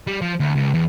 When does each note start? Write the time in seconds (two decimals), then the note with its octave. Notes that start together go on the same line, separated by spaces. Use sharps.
0.07 G3
0.21 F3
0.40 D2
0.56 C#2
0.74 E2